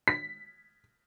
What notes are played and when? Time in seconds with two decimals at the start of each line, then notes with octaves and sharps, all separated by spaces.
0.08 B6